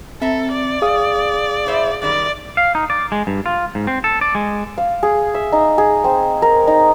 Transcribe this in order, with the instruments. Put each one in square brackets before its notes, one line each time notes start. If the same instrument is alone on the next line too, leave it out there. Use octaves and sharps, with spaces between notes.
[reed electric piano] C4 [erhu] A4 [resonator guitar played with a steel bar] E5 A#5
[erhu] D5
[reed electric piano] G#4 F5 D#6
[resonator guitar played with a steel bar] E4 C5 E5
[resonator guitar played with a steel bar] F#2 D#3 G3 [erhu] D5
[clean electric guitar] F5
D#4
D5
G#3
G2
F4
G#2
C4
A4
D5
G#3
[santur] F5
G#4
E5
D#4
G#4
C4
A#4
D#4